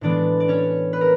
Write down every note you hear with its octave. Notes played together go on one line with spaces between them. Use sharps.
A2 E3 G#3 B3 D4 D5
D5
C#4 C#5
B4
A#4